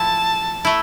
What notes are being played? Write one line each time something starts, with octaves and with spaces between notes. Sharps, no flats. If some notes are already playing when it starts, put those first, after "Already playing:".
Already playing: F3 A3 E4 A5
A3 E4